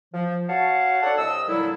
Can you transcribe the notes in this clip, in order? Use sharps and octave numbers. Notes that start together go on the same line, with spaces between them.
F3
F#4 C#5 F5 F#5 A5
D4 A4 C#5 D5 F#5
C2 D#5 E6
A#2 D3 F#3 G3 E4 A4